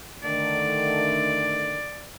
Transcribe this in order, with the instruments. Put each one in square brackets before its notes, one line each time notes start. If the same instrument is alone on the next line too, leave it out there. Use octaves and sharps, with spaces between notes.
[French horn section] D3 D#3 A3 [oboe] D5